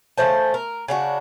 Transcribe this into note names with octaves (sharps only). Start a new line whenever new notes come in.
C#3 A3 C5 A5
A#4
C#3 D4 F#4